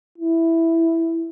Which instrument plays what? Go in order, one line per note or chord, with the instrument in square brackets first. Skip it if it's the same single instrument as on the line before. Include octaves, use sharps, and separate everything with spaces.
[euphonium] E4